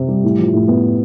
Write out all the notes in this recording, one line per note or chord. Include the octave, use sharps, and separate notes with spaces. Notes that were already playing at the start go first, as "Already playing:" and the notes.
Already playing: C3 C4
G3
A2
F3
A2
B3